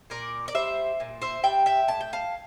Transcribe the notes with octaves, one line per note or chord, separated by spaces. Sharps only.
A#2 A#4 D5
D5
G3 C5 E5
A#2
C5 E5
G3 E5 G5
E5 G5
A2 A5
G5
F5 A5